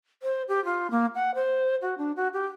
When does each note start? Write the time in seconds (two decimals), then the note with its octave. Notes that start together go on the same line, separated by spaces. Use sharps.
0.23 C5
0.48 G4
0.65 F4
0.91 A#3
1.15 F#5
1.35 C5
1.82 F#4
1.98 D4
2.16 F#4
2.33 G4